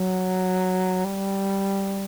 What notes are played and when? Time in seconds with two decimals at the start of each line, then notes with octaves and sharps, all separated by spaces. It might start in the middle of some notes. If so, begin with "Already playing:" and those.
Already playing: F#3
1.04 G3